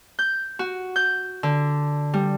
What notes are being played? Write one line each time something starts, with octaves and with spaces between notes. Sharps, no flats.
G6
F#4
G6
D3
G3